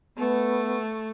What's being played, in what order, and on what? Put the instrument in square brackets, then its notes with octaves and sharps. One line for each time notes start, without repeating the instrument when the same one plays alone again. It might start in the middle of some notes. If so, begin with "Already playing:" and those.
[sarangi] A3 [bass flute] B3